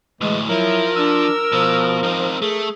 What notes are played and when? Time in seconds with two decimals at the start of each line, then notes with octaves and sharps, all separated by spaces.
0.21 D2 A2 E3 G#3
0.49 F3 F#3 E4 A#4
0.96 D4 E6
1.52 B2 F3
2.03 C4 D#4
2.42 A3 G#4